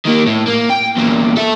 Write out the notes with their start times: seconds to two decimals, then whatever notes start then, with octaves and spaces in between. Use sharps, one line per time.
0.05 D#3 A#3
0.26 A2
0.47 A#3
0.70 G5
0.97 E2 A#2
1.37 A4 E5